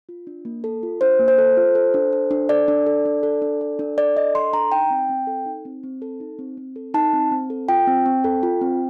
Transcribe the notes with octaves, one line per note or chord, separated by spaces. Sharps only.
F4
D4
A#3
A4
F4
D4 C5
A#3
C5
A4
F4
A4
D4
A4
D4
A4 D5
D4
A4
D4
A4
D4
A4
D4
A4 D5
D4 D#5
A4 C6
D4 A#5
D#4 G5
C4
C4
A4
D#4
C4
C4
A4
D#4
C4
C4
A4
D#4 A5
C4
C4
A4
F4 G5
C4
C4
A4
F4
C4